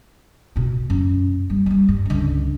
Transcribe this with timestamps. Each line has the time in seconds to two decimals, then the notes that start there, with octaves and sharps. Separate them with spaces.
0.56 B2 F4
0.90 F#2
1.50 G3
1.66 G3 A3
1.89 G2
2.05 C#2 D3